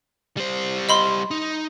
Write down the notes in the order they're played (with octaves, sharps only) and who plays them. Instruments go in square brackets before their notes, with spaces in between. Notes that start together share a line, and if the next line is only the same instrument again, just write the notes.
[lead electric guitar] G3 C5
[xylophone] D#5 B5 C6
[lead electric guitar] D#4